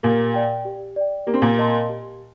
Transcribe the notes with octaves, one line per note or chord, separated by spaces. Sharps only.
A#2 A#3 G4
D5 G5
G4
D5 G5
A#3 G4
C4
A#2 A#3
A#4 D#5 A5 C6
G4